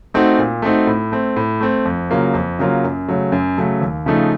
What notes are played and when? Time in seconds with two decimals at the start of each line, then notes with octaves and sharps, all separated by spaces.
0.14 A3 C4 D#4 F#4
0.39 A#2
0.62 A3 C4 D#4 F#4
0.87 A2
1.12 A3 C4
1.36 A2
1.61 A3 C4
1.85 F2
2.10 C#3 F#3 A#3 F4
2.34 F2
2.59 C#3 F#3 A#3 F4
2.84 F#2
3.08 C#3 F#3 A3
3.32 F#2
3.58 C#3 F#3 A3
3.81 D#2
4.06 C#3 F3 A3 D#4